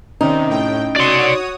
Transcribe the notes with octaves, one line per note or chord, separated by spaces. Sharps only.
C3 D#3 C#4 D#4
A2 G5
F#4 C#5 D5 C6 D#6